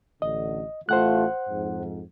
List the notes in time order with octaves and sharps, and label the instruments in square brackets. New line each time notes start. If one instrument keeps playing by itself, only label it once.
[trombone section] A1 D3 [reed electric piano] D#5
[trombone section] A1 A3 F4 [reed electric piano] C5 F#5 F#6
[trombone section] F2 G#2